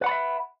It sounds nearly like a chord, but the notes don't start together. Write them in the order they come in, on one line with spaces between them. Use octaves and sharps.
B4 F#5 B5 D5 E5